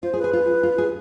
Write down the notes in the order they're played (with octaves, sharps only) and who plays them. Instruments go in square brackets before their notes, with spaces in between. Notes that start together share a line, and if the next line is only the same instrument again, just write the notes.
[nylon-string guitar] F4 [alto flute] C5
[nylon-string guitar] G#4
[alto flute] B4
[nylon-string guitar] G#4
F4
F4
G#4